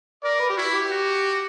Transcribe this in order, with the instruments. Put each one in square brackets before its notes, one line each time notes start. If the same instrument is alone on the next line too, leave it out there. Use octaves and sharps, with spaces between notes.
[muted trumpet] A#4 [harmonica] D5
[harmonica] B4
G4
[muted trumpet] E4 [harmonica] F#4
[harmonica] G4
[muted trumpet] F#4